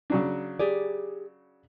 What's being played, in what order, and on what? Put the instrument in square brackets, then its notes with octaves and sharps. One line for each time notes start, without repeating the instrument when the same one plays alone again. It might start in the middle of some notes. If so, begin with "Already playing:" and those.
[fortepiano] C#3 F#3 D4
[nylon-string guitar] G4 G#4 D5